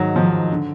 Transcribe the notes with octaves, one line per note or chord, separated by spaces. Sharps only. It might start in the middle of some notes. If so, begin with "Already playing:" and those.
Already playing: G#2 D#3 F#3
G#2 D#3 F3
D3